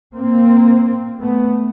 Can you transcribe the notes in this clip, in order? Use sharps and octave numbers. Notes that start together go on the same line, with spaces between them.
A#2 A#3 C4
A3 B3